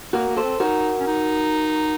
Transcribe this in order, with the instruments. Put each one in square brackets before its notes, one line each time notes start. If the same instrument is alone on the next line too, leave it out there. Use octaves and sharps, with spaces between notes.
[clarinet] A#3 [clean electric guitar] F#4 A#4
[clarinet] A#3
[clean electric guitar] A4 C5
[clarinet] C4
[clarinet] D#4 [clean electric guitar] F#4 A#4
[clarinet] C#4
D#4